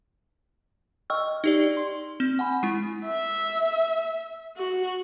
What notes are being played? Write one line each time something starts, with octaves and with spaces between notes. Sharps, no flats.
D#5 G5 C#6 E6 F6
D#4 G4 D5
C6
C4
F#5 G#5 B5
G#3 E4
E5
F#4